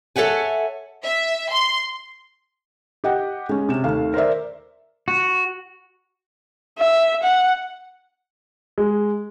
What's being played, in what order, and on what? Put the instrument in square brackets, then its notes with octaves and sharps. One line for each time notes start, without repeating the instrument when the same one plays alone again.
[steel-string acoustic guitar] A4 C#5 E5 F#5 G#5
[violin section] E5
C6
[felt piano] G4 D#5 F#5 G5
G#3 C#4
C3 E7
D#2 A3 F5
A#4 C5 D5 E5
[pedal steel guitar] F#4
[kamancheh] E5
F#5
[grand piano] G#3